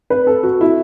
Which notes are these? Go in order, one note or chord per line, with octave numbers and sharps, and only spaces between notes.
B4
A4
F#4
E4